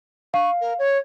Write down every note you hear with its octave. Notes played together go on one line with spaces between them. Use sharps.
F5 C#6
A#4
C#5